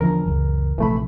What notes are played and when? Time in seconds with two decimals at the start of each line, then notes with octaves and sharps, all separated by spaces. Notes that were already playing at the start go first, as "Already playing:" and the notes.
0.01 E2 D3 E3 F3 A#4
0.26 C#2 F#2
0.78 A#1 C3 E3 A3 B5